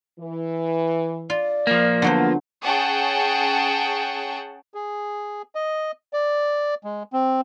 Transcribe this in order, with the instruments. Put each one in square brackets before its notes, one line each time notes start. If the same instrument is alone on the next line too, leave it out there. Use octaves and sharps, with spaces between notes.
[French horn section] E3
[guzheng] F4 [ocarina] D5
[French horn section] A#2 [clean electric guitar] F3 A#3
[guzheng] D3 F#3 C5 [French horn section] B3 F4
[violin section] C#4 G#4 F#5 G5 A5 C#6
[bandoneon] G#4
D#5
D5
G#3
C4